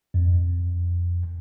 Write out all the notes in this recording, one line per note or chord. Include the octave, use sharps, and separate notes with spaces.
F2